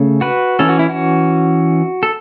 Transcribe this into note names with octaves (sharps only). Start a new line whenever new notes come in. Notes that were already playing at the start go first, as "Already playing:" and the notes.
Already playing: C#3 A3 C#4
F#4 B4
E3 C#4 A4
F#4
E4
F#4
A4